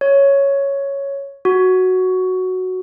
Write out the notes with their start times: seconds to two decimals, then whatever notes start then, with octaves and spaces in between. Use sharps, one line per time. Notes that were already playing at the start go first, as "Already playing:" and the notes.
0.01 C#5
1.45 F#4